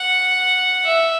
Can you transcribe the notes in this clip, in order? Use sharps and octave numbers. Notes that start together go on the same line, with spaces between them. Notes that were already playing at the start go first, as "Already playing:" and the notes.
Already playing: F#5
E5